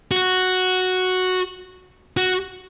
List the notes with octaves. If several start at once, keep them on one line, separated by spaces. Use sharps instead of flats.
F#4
F#4